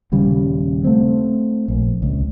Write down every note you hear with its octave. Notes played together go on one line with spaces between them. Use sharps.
D#1 C#3 G3
A3 C4
A#1
C#2